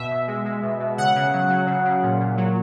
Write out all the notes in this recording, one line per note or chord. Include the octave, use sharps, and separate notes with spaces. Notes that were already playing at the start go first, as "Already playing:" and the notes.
Already playing: B2 E5
B2
G#3
G#3
B2
B2
C#3 F#5
C#3
F#3
F#3
C#3
C#3
A#2
A#2
F#3